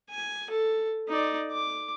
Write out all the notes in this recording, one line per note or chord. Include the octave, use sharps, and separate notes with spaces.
G#5
A4
D#4 D5
D6